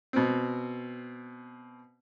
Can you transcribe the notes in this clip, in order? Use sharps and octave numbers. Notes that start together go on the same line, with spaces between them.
B2 C4